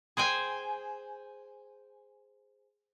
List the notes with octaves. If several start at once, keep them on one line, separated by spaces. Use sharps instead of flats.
G#4 C5 G5 G#5